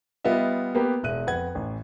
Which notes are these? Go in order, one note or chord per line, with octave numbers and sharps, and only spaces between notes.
G3 B3 F4 D#5 E5
A#3 B3 G4 B4
E1 E5 F#6 D#7
F2 B4 F#5 G#6
A1